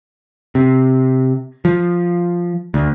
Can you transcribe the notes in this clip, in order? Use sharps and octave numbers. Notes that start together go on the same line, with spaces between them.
C3
F3
D2